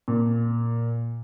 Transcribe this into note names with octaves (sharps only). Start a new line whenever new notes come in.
A#2